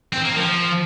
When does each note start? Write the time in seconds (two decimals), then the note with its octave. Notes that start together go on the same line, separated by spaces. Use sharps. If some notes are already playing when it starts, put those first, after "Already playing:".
0.13 C4
0.25 A#3
0.36 F3